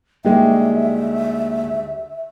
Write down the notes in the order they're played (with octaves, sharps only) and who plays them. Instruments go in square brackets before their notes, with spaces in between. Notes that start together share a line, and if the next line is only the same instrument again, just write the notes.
[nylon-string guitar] D2 G3 G4 [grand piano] G#3 D#4 [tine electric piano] A#3 [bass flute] E5